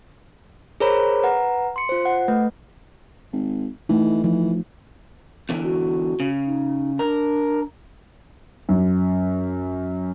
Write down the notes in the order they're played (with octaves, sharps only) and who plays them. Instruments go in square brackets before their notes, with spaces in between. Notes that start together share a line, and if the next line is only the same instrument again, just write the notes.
[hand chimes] G#4 A#4 C5 C#5 A#5 B5
B4 F#5 A#5
C6 C#7
F4 C5
F#5
A3 B4
[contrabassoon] G#1
[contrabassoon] E3 [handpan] A3 D#4
[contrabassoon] E3 [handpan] F3
[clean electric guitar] E2 D3 E3
[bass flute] F#4
[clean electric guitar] C#3
[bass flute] D#4
[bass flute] D4 [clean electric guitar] A#4
[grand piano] F#2